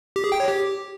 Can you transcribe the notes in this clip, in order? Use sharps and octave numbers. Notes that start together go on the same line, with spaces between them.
G4
G#4
G5
C#5
G4